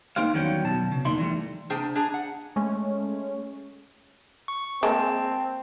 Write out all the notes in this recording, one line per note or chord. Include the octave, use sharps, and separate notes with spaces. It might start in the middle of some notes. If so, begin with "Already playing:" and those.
A#3 D#4 G4 C5 F5
E2 D#3 F#3 G3 C#4 G5
B2 F#3 A5
C#3
E2 A#3 D#4 D5 E5 C6
E3 G3 A3
C3 A#3 D4 G#4 C5 G5
D4 G#4 A#5
F#5
G#3 A3 C#4
C#6
G#3 A#3 C4 A5